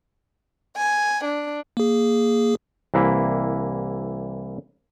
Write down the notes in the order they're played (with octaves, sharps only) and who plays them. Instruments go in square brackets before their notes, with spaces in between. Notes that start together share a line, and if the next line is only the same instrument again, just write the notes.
[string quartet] G#5
D4
[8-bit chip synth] A#3 G#4
[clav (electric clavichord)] C2 E3 A#3 E4